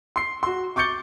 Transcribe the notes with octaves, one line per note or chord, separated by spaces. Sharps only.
C6 C7
F#4 C6
C#6 D6 G6 A6 C#7 G7